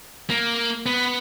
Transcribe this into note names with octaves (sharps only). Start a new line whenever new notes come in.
A#3
B3